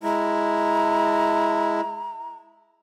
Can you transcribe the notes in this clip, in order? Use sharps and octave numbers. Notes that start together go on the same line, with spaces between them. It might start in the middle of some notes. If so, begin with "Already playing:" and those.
G#3 E4 A#5